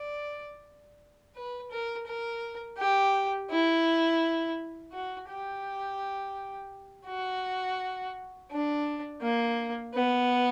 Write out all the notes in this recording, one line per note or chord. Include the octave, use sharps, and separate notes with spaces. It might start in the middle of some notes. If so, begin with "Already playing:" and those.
Already playing: D5
B4
A#4
A#4
G4
E4
F#4
G4
F#4
D4
A#3
B3